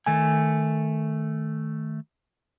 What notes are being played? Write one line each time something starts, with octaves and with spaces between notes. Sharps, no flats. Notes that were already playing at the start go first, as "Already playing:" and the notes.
D#3 A3 G#5